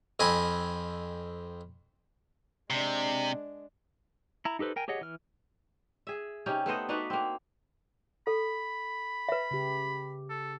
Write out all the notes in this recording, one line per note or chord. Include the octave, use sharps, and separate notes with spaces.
F2 C4 D#5 G#5 B5
C3 G#3 D4
E4 A#5
D#4 G4 A4 B4 C5
A#4 G5 G#5
G4 G#4 C#5 D#5 F#5
E3 F6
G#4 E5
C3 C#4 D#4 G4
A3 B3 C5 D#5
D4 D#4 F#4 B4
A#3 C4
A4 B5
B4 E5
C#3 G4
A4